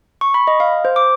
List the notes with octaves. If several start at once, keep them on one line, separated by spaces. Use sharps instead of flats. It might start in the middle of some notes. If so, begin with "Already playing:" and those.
C#6
B5
D#5
F5
C5
D6